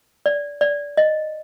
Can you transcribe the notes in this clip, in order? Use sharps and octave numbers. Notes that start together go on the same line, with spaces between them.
D5
D5
D#5